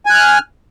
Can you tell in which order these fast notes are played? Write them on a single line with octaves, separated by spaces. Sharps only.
G#5 F#6 F6